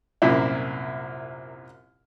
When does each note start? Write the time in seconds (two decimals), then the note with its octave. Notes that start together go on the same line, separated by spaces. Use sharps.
0.22 C2 F#2 A#2 E4